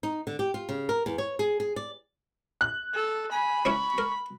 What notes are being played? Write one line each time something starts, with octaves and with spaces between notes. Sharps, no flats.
D#4
D3
G4
F4
C#3
A#4
E2
C#5
G#4
G#4
D5
F#6
A4
G#5 B5
C#4 E4 C#5 C#6
A#4